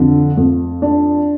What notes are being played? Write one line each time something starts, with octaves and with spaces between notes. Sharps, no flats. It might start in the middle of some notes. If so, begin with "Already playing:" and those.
Already playing: F2 D3
F2
D4